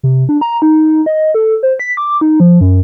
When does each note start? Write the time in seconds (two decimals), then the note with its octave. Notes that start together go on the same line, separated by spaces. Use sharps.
0.03 C3
0.29 D4
0.41 A#5
0.62 D#4
1.06 D#5
1.34 A4
1.63 C5
1.80 B6
1.97 D6
2.21 D#4
2.40 F3
2.61 F#2